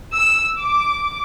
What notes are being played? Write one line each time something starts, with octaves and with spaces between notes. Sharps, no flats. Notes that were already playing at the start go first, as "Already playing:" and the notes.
E6
D6